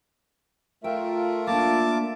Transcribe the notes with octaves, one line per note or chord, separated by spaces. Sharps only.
A3 F4 A#4 E5 G5
A#3 D4 A5 D6